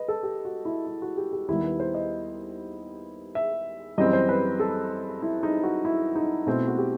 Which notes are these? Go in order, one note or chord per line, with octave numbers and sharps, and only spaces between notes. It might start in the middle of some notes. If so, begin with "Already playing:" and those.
Already playing: B4 D#5
A4
G4
F#4
E4
E4
F#4
G4
G4
D#2 D#3 G3 B3 E4
B4
C5
D#5
E5
F#2 E3 G3 C4 D#5
C5
B4
A4
E4
D#4
F#4
E4
D#4
B2 A3 C4 E4
F#4
G4